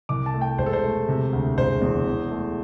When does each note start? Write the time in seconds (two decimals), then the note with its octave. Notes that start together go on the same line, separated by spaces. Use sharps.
0.09 C2 D6
0.26 A5
0.34 A3
0.41 G5
0.58 E1 C5
0.66 A4
0.73 C5
0.83 A3
1.08 C3
1.32 D2
1.57 E1 C5
1.81 E2
2.06 E2
2.31 A3